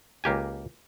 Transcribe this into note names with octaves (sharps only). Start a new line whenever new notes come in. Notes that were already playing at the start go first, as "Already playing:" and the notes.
C#2 A#3 G4 G#5